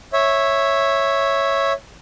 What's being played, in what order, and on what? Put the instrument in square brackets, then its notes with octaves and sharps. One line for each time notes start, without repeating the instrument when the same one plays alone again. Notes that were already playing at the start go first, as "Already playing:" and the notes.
[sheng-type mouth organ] C#5 E5